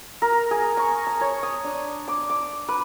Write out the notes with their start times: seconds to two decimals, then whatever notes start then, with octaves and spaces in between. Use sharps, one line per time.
0.22 A#4
0.51 G#4
0.77 C#6
1.07 A5
1.21 C#5
1.43 D#6
1.64 D4
2.08 D6
2.30 D6
2.68 B4